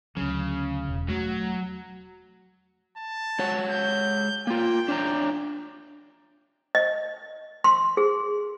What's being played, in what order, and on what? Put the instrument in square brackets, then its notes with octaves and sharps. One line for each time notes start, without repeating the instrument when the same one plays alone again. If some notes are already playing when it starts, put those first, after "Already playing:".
[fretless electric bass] D2 F#3 [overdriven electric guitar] C#3
[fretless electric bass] E1
[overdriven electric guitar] F#3 [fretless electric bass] A3
[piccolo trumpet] A5
[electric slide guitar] G#3 C#5 F#5
[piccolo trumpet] G6
[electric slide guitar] A#3 F4 [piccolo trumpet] G5
[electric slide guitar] D4 C#5 A#5
[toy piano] D#5
C6
G#4